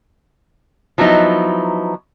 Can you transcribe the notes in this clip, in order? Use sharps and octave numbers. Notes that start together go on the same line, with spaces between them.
F3 F#3 B3 D#4 E4